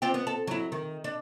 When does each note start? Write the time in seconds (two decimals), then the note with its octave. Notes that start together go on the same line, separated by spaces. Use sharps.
0.02 C4 F4 G4
0.14 B3
0.27 A4
0.47 F#3 E4
0.72 D#3
1.04 D4